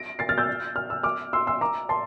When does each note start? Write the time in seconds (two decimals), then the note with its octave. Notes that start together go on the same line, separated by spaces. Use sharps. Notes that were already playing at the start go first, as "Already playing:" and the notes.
Already playing: A#6 D7
0.19 A6 C7
0.29 F6 A6
0.38 E6 G6
0.76 F6
0.90 E6
1.03 D6 F6
1.33 C6 E6
1.47 C6 E6
1.61 A#5 D6
1.89 A5 C6